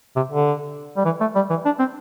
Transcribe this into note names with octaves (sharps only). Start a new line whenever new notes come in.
C3
D3
G3
E3
A3
G3
E3
D4
C4